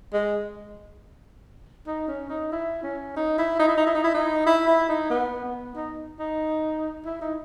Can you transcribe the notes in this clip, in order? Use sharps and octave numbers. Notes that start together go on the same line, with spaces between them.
G#3
D#4
C#4
D#4
E4
C#4
D#4
E4
D#4
E4
D#4
E4
D#4
E4
D#4
E4
E4
D#4
B3
B3
D#4
D#4
E4
D#4